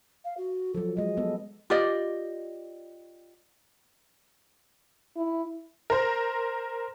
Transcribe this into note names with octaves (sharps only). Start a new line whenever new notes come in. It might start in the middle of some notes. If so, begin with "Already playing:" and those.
F5
F#4
F3 F#3 A4
F#3 G#3 D#5
G#3 B3 A4
F4 G4 D5 D#5
E4
A#4 C5